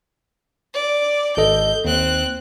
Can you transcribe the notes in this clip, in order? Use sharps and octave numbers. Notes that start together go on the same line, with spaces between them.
D5
G#1 A4 D#5 G6
D#2 C4 F#6